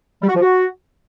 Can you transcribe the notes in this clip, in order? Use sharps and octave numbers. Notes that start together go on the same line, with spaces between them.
G3
F#4
F3
F#4